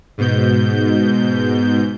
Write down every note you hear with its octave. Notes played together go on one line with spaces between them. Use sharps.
G#2 B2 G6